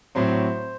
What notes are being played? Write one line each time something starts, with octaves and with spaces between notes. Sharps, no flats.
A2 F#3 C4 C5